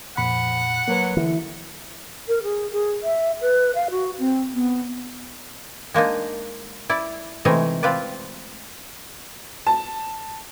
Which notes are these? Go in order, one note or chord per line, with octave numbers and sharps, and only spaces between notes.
F2 A#2 F3 F#5 B5
F#3 A#3 B4
D3 E3
A#4
G#4
G#4
E5
B4
F5
F#4
C4
B3
G#3 A#3 D4 D#4
E4 D5
C3 E3 G#3 A3 D#4
C4 F4 B4 D5
A5